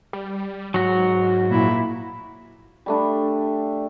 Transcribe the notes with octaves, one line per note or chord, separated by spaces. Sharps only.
G3
G#2 F#3 F#4
A#2 E4
G3 A3 D4